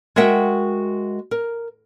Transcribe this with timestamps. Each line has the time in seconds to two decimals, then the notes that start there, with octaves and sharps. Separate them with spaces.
0.16 G#3 F#4 A#4 E5 F#5 G5
1.31 A#4